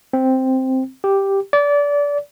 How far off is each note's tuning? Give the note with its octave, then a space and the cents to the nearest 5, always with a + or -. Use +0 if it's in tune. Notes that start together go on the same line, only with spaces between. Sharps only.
C4 +0
G4 +0
D5 -25